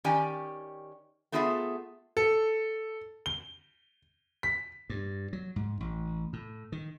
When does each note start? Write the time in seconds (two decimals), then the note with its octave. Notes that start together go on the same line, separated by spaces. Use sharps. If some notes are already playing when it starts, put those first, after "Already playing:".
0.04 D#3 C#4 G4 D5 G5 G#5
1.32 A3 B3 F4 G#4 C#5 E5
2.17 A4
3.26 G7
4.43 B6
4.90 G2
5.33 F#3
5.56 G#2
5.81 A1
6.33 A2
6.72 D#3